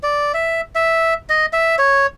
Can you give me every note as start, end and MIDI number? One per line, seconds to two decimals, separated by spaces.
0.03 0.32 74
0.34 0.61 76
0.75 1.14 76
1.30 1.46 75
1.53 1.76 76
1.79 2.06 73